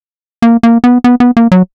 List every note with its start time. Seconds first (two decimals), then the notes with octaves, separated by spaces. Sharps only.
0.42 A#3
0.63 A#3
0.84 B3
1.04 B3
1.20 B3
1.37 A#3
1.52 F#3